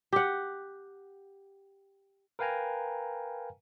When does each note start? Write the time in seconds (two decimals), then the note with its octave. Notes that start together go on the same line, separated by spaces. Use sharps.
0.13 G4 F#5
2.39 A#4 B4 F5 G5 G#5 A#5